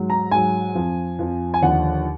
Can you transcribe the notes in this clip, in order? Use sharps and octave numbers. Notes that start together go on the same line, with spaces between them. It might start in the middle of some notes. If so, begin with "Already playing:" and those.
Already playing: G#2 F#3
A#5
G#2 F#3 G#5
F2 F3
F2 F3
G#5
D#2 D3 F3 F#5